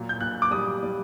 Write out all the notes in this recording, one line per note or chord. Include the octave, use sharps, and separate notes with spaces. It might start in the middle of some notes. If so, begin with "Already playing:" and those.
Already playing: A#2 F#3
G6
A#2 F#6
D6
G3 D#6
G3